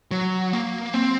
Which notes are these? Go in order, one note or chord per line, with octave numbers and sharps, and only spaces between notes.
F#3
A#3
C4